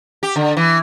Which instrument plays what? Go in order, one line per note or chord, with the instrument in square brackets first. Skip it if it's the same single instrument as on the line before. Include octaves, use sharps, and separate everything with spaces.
[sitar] G4
D3
E3